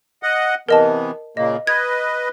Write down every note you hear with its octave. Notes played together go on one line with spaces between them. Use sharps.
D#5 F#5
C3 E3 B3 A#4 D#5 A5
A#2 C#3 A#3 D#5
B4 D#5 G#6